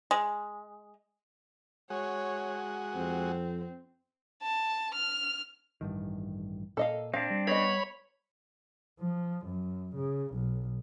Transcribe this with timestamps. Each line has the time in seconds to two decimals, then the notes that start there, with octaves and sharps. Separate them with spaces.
0.11 G#3
1.90 G#3 F#4 C#5
2.95 F2 C4
4.43 A5
4.94 F6
5.81 A1 G2 D#3
6.77 A#2 A4 D#5 F5
7.14 C4 D4 F5
7.30 G3
7.47 B3 C#5 D#5 B5
9.00 F3
9.46 F#2
9.96 C#3
10.34 B1